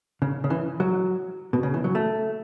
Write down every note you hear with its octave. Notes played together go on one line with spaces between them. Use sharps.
C#3
C#3
E3
F#3
B2
C#3
E3
F#3
A3